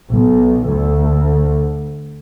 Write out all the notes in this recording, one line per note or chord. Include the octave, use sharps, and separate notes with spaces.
B1
D2